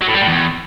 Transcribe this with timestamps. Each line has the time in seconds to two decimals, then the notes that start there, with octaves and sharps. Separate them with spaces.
0.02 F#3
0.08 A2
0.15 G3
0.21 A2
0.28 E2